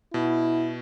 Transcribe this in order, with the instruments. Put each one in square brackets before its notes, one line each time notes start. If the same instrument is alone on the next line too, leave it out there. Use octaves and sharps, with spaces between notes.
[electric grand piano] B2 [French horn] E4